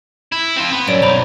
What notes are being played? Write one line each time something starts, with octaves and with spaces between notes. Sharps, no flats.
E4
C4 F4
B3
F#2 C#5 D5 D7
B1 C5 A#5 B5